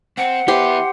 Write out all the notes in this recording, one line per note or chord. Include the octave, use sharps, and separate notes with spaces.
C4 F#5
B3 E4 G4 C5 C6